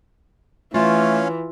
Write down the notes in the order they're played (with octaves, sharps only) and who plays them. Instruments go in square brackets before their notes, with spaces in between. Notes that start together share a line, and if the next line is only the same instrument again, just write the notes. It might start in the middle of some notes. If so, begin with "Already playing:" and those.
[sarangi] E3 [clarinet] A3 [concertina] C#4 C#5 F5 [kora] F4